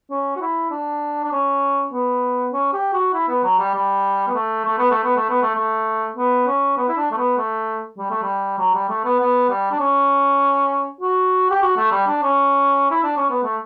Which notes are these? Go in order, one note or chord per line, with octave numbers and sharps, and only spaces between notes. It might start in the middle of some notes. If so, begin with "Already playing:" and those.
C#4
F#4
E4
D4
D4
C#4
B3
C#4
G4
F#4
E4
B3
F#3
G3
G3
B3
A3
A3
B3
A3
B3
A3
B3
A3
A3
B3
C#4
B3
E4
D4
A3
B3
A3
G3
A3
G3
F#3
G3
A3
B3
B3
G3
D4
C#4
F#4
G4
F#4
A3
G3
D4
C#4
E4
D4
C#4
B3
A3